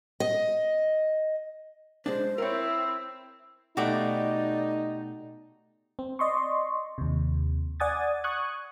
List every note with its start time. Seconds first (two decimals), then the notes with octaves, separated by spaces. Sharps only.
0.20 D#5
2.06 G#3 D4 C5
2.38 C4 E4 A#4 C#5 E6
3.77 B2 A3 D#4 F#4 G4 D5 D6
5.99 C4
6.19 D5 D#5 C6 C#6
6.98 D#2 C3
7.80 D5 F#5 G#5 D#6 G#6 A6
8.24 C#6 D#6 F#6 G#6